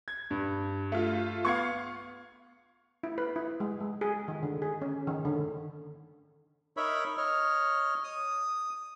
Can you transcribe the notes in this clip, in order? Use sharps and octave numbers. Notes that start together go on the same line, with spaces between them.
G#6
G2
A3 F4
B3 F5 C#6 G#6 C#7
E4
B4
E4
G#3
G#3
G#4
D#3
D3
G#4
C#4
D#3
D3
D#4 A#4 C#5 E5 B5
C#5 D#5 F6
D#6